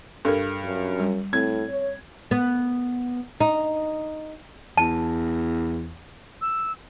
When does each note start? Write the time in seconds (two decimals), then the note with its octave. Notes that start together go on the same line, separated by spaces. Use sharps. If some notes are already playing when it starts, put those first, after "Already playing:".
0.25 G2 A4 A#4
0.65 F#2
0.99 G3
1.33 A2 C4 G#6
1.69 C#5
2.31 B3
3.41 D#4
4.77 E2 A5
6.41 E6